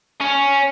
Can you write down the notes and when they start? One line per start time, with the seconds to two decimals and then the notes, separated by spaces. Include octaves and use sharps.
0.21 C#4